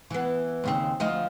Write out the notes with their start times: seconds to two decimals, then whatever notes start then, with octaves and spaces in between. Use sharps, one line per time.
0.10 E3 B3
0.64 D#2 C#3 C4
1.00 D2 F3 D#5